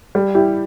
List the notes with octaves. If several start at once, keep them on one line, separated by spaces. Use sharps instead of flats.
G3
E4 G4